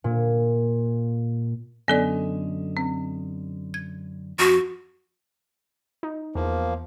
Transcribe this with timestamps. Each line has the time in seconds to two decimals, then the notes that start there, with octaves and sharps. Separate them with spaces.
0.04 A#2
1.88 F#2 D3 B3 A4 D5 D#5
2.77 C4
3.74 G#6
4.39 F2 F#4
6.03 D#4
6.35 E2 F3 A#3